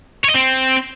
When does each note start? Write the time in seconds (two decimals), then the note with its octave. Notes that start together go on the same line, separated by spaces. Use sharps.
0.24 C#5
0.30 D#5
0.35 C4